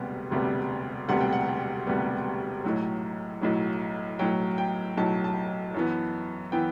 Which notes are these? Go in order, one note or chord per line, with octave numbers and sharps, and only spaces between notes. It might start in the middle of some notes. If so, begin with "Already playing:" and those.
Already playing: E1 D2 C3 G3 B3
E1 D2 C3 G3 B3
E1 D2 C3 G3 B3 F#5
G5
F#5
E1 D2 C3 G3 B3
B1 A2 F#3
B1 A2 F#3
B1 A2 F#3 G5
G5
B1 A2 F#3 A5
A5
F#2 E3 B3
E3 B3 G5